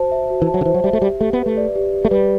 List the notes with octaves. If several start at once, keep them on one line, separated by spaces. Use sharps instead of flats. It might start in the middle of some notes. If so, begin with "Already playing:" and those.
Already playing: F#4 C5 A5
E5
F#4
E3
A5
F#3
D3
E3 C5
F#3
G3 E5
A3
G3 G4
A3 G4
B3
B4
A3
D5
G4
G4
A3
G3 B4